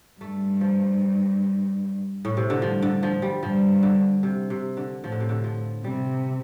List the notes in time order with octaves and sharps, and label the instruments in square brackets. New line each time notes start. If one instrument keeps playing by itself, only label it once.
[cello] G2 [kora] A3
[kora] F3
A2
C3
D3
[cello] G2 [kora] F3
[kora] D3
F3
G3
[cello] G2 [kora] F3
[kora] D3
C3
C3
D3
[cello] A2 [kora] F3
[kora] D3
C3
D3
F3
[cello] C3 [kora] G3